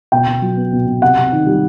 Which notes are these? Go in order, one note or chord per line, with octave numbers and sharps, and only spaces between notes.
B2 G5
B2
F#3
B3
B2
B2
C3 F#5
C3
D#3
G3